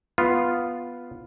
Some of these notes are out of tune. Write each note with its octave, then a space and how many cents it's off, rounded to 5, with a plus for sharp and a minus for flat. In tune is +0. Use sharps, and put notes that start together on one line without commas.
B3 +0 F4 +0